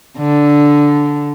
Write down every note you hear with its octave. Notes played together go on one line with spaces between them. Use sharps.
D3